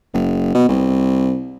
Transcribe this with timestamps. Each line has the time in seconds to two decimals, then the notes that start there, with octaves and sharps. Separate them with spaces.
0.14 F#1
0.54 B2
0.68 C2